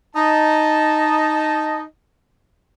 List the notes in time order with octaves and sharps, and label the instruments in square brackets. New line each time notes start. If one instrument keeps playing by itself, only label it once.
[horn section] D#4 D#5 A5